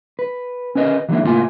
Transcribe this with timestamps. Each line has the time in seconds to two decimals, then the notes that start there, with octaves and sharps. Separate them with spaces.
0.19 B4
0.75 C#4 A#4 B4 D#5
1.09 E3 F#3 G#3 A#3 D4 E4
1.23 C#2 A2 F3 A#3 F4 G#5